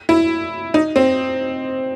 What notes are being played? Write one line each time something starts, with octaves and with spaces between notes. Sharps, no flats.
E4
D#4
C4